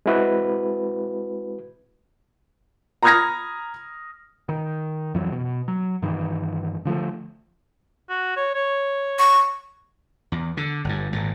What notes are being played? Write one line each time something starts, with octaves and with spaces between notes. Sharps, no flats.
G#3 C4 E4 F#4 B4
A#5 B5 D#6 F6 G#6 A#6
D#3
F2 E3 F#3
B2
F#3
G2 D#3 E3
D3 F3 G#3 A3
F#4
C#5
C#5
C#6
E2
D3
G1 G2
G#1 A#2